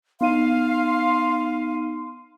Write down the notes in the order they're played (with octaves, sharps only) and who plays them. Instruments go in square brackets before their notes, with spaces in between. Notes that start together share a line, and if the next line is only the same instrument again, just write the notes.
[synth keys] B3 D#4 D#7 [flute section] F5 [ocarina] C6